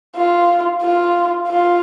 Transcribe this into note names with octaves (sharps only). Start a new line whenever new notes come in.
F4
F4
F4